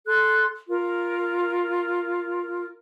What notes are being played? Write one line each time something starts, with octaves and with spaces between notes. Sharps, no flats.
A4 C6 F#6
F4 A#4